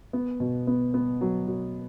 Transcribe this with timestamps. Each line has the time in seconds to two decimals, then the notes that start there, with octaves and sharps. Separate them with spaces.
0.13 B3
0.40 B2
0.67 B3
0.94 B3
1.21 F#3
1.47 F#3